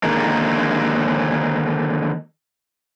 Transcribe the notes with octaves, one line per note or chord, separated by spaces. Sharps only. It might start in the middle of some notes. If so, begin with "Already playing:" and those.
D3 D#3 G#3 A#3